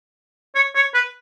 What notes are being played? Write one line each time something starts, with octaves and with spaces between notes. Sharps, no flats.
C#5
C#5
B4